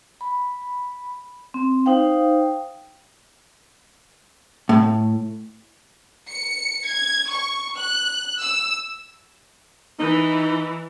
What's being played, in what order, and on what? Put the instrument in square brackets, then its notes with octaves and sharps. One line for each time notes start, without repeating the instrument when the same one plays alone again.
[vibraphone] B5
C4
D#4 C5 F5 G5
[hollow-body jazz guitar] A2
[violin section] C#7
G#6
C#6
F#6
E6
[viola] E3 [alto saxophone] D#4